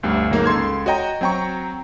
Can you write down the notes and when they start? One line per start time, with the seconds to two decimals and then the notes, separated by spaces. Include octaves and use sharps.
0.03 G1 D2 G3
0.31 G1 F#3 G#3 A#3 D#4
0.46 C#2 A4 C6 G#6
0.86 F#4 C#5 D#5 G5 A#5
1.21 F#3 C4 G5 A#5 C#6